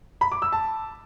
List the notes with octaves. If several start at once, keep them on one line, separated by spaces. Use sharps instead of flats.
B5
D6
E6
A5